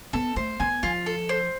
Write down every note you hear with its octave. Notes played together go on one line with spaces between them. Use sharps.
B3 A4
A3 C5
B3 G#5
F3 F4
A4
C5